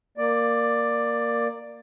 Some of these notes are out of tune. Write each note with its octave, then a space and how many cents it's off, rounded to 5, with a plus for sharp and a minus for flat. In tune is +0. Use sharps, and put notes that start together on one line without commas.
A#3 +0 D5 +10